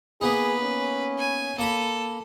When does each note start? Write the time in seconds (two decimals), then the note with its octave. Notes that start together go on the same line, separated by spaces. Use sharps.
0.21 A#3 B3 D#4 G#4 B4
0.63 C#4
1.18 G#5
1.59 A#3 A4 A#5 B5